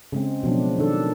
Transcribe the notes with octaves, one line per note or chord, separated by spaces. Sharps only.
C#3 G#3 C4
B2 F3 F#3 D4
D#3 D4 A4